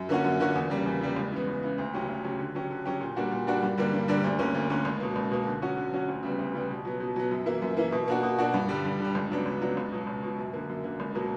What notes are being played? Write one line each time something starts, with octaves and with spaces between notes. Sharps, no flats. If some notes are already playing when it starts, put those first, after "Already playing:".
Already playing: F#2
D3 A#3 C#4 F#4
F#2
D3 A#3 C#4 F#4
E2
C#3 G3 A#3
E2
C#3 G3 A#3
C#2
C#3 E3 B3
C#2
C#3 E3 B3
D2
C#3 F#3 C#4 G4
D2
C#3 F#3 C#4 G4
D3
F#3 C#4 G4
D3
F#3 C#4 G4
A#2
G3 A#3 D4 F#4
A#2
G3 A#3 D4 F#4
G2
D3 G3 A#3 D4
G2
D3 G3 A#3 D4
D2
D3 A#3 C#4
D2
D3 A#3 C#4
C#2
B2 A#3
C#2
B2 A#3
D3
F#3 C#4 F#4
D3
F#3 C#4 F#4
D2
C#3 G3 B3
D2
C#3 G3 B3
B2
F#3 B3
B2
F#3 B3
F#2
E3 A#3 E4
F#2
E3 A#3 E4
B2
A#3 D4 F#4
B2
A#3 D4 F#4
G2
D3 G3
G2
D3 G3
C#2
C#3 F#3 B3 D4
C#2
C#3 F#3 B3 D4
C#2
B2 F#3
C#2
B2 F#3
F#2
D3 A#3
F#2
D3 A#3
C#2
B2 F#3 A#3